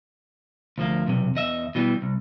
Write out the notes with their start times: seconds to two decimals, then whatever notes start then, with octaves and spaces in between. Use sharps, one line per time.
0.78 D2 F3 A#3
1.07 B1 E2 C3
1.35 E2 D#5 E5
1.75 B2 E3 G3
2.02 C2